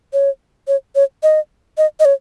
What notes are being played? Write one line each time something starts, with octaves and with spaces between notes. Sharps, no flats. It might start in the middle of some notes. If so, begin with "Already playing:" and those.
C#5
C#5
C#5
D#5
D#5
D#5
C#5